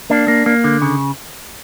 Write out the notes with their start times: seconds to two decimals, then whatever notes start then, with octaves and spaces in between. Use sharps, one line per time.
0.10 A#3 D4
0.28 A#3
0.46 A#3
0.64 D3
0.82 C#3